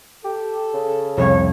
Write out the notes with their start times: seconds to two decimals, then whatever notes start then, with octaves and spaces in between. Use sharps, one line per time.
0.25 G4 A4
0.74 C#3
1.18 C2 F2 C#5